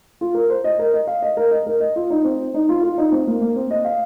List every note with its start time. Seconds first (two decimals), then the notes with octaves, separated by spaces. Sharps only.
0.21 F4
0.34 A#4
0.50 C5
0.64 D#5
0.79 A#4
0.93 D#5
1.07 F5
1.22 D#5
1.37 A#4
1.51 D#5
1.66 A#4
1.80 D#5
1.96 F4
2.10 D#4
2.24 C4
2.54 D#4
2.69 F4
2.83 F4
2.98 D#4
3.12 C4
3.27 A#3
3.41 A#3
3.56 C4
3.71 D#5
3.85 F5